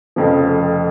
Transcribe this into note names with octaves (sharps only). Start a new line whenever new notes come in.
F1 F2 C#3 F3